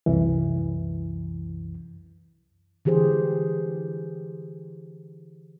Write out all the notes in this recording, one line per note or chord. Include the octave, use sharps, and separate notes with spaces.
C2 F#2 E3
D3 E3 G4 G#4 C5